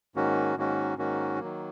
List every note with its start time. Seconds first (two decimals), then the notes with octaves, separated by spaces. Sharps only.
0.16 G#2 D#3 A#3 C#4 F#4
0.57 G#2 D#3 A#3 C#4 F#4
0.98 G#2 D#3 A#3 C#4 F#4
1.39 D#3 F#3 A#3